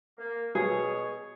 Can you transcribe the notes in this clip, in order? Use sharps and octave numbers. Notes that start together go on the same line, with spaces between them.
A#3
B2 G#4 C#5